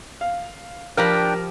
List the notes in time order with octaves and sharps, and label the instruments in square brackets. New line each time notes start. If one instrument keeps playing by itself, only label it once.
[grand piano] F5
[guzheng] F3 G4 B5 [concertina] D4 G5 [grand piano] A#4